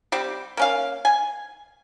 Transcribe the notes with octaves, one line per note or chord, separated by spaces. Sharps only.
G3 C4 G4
A#3 C#4 F5
G#5